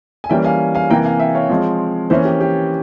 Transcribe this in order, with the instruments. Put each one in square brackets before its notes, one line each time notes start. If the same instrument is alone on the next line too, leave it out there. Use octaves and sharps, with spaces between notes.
[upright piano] G#5
E3 G3 A#3 C#4 E5 G5
F5 G#5
F5 G#5
C3 E3 A#3 G5 A#5
F5 G#5
E5 G5
C#5 F5
F3 G#3 C4
E3 A#3 C#4 C5 E5
G4
G4